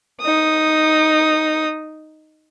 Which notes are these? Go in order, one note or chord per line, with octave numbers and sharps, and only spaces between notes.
D#4 D#6